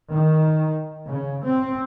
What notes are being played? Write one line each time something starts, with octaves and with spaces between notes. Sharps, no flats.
D#3
C#3
C4